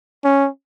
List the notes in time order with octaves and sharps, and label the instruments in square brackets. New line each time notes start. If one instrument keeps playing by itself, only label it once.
[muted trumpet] C#4